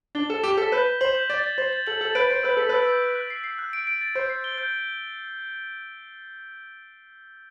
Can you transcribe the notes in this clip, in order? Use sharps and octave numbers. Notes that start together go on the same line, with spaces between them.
D4 G7
A4 E7
G4 G7
A4 B6
B4 G6
G6
C5 F#7
G6
D5 A6
A6
C5 A6
A6
A4 F#7
A4 F#7
B4 D7
C5 G6
B4 E6
A4 B6
B4 E6
G6
F#6
F#6
C7
C7
F#6
D7
D7
A6
C5 G6
C7
G7
G6